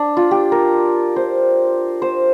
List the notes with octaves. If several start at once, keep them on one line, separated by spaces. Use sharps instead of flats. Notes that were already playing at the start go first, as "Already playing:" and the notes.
Already playing: D4
F4
G4
A#4
C5
C5